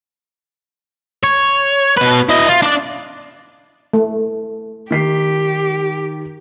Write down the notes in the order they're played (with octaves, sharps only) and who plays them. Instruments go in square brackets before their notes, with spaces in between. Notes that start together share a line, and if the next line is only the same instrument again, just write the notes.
[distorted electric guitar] C#5
B2 B4
E4 D#5
F4
D4 D5
[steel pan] A3
[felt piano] D#3 B6 C7 [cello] G4